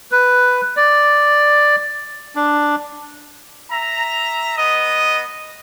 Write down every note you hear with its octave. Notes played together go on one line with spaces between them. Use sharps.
B4
D5
D4
E5 A#5
B3 D#5